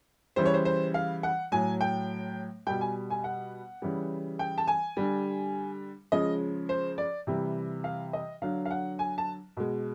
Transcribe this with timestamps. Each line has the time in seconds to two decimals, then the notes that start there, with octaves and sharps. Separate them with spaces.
0.36 C#3 E3 G3 C5
0.46 C#5
0.54 C5
0.65 C5
0.94 F5
1.23 F#5
1.52 A2 F#3 G#5
1.81 G5
2.67 B2 G3 G5
2.81 G#5
3.10 G#5
3.24 F#5
3.82 C#3 E3 G3
4.39 G5
4.58 A5
4.68 G#5
4.97 D3 G3
6.12 C#3 F3 G#3 D#5
6.69 C5
6.98 D5
7.27 C3 E3 G3
7.84 F5
8.13 D#5
8.42 D3 F#3 F5
8.65 F5
8.71 F#5
8.99 G#5
9.18 A5
9.57 B2 G#3